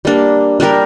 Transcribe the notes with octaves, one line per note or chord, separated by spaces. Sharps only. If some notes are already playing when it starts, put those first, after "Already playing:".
G3 A#3 D4
G3 D4 G4 A#4